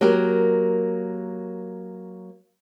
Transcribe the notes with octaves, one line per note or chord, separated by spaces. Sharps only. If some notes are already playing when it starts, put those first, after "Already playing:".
F#3 A#3 G4 A#4